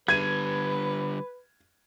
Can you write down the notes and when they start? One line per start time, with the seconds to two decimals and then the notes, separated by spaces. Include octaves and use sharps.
0.08 D3 G3 B4 G#6 D#7